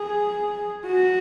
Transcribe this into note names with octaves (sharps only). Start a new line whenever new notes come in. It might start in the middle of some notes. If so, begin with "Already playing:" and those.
Already playing: G#4
F#4